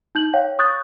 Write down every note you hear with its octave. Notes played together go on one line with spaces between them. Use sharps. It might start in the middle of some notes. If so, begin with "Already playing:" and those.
D#4 G6 F#7
C#5 F5 G5
C#6 D#6 F#6 G6 A6